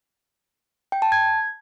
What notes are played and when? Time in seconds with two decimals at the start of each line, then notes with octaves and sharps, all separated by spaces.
0.92 G5
1.02 A5
1.12 G#6